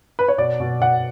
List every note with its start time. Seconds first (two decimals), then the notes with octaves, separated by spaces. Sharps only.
0.19 B4
0.28 C#5
0.38 B2 D5
0.60 B2
0.81 B2 F#5